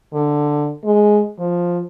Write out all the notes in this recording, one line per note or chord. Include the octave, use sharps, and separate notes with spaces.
D3
G#3
F3